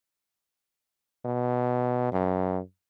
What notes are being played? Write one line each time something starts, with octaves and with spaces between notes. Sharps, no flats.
B2
F#2